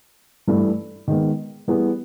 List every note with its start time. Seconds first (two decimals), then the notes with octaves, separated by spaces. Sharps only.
0.48 G2 E3 A3
1.08 D#3 G#3 B3
1.68 E3 G3 B3 E4 G#4